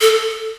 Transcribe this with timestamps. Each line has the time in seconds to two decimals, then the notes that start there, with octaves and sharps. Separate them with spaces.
0.01 A4